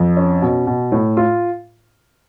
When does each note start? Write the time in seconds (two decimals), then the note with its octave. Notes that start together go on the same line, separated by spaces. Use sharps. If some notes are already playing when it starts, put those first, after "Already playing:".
Already playing: F2
0.17 C#4
0.42 B2
0.67 B2
0.92 A2
1.17 F4